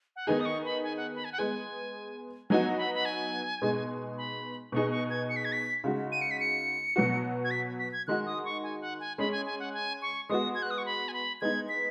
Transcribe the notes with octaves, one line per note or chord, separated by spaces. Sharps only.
F#5
D#3 B3 D#4 G#4 G#5
D#6
C#6
B5
G#5
F#5
B5
G#5
F#5
G#3 B3 G#4 G#5
F#3 B3 D#4 F#4 G#5
B5
B5
G#5
B2 G#3 B3 D#4 G#4
B5
B2 B3 D#4 G#4 C#6
C#6
G#6
C#7
B6
G#6
B6
C#3 G#3 D#4 F#4
D#7
C#7
B6
C#7
B2 F#3 B3 F#4
G#6
B6
B6
G#6
D#3 G#3 D#4 F#4 F#6
D#6
C#6
G#5
F#5
G#5
G#3 C#4 G#4 B5
G#5
G#5
F#5
G#5
C#6
G#3 B3 F#4 D#6
G#6
F#6
D#6
C#6
B5
G#5
B5
G#3 B3 D#4 G#6
B6